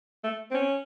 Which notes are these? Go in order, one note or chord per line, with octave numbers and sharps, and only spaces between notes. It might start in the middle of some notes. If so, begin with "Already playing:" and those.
A3
C4
C#4